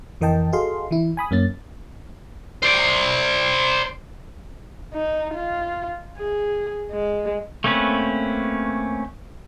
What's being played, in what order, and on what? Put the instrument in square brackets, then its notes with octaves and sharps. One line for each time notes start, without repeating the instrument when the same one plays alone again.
[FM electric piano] F2 E3 A#4 D#5 G5 A5
F#4 G#4 A4 D#5 F5 C6
E3 E4
G#5 B5 D#6
F#2 A#3 C#4 A6
[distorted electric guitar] C5 D5
[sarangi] D#4
F4
G#4
G#3
[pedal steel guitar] A3 A#3 C4 C#4 B4